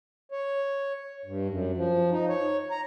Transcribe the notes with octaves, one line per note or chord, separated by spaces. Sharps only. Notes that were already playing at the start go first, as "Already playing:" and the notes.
C#5
G2
F#2
F3
D#4
C#5
A#5